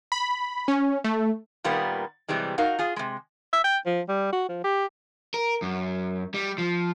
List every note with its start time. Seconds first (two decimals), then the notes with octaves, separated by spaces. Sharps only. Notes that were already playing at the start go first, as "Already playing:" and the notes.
0.12 B5
0.68 C#4
1.04 A3
1.64 A#2 D#3 G3 A#3 B3
2.28 C3 E3 G3 G#3
2.58 D#4 F#4 A#4 F5
2.79 F4 G#4
2.96 C3 G#3
3.53 E5
3.64 G5
3.86 F3
4.09 G3
4.32 F#4
4.49 F3
4.64 G4
5.34 A#4
5.62 F#2
6.34 G3
6.58 F3